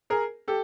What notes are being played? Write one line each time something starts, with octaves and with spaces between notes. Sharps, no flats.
G#4 A#4
G4 A4